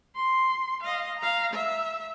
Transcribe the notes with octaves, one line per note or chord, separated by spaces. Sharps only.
C6
D#5 F5
F5 A#5
E5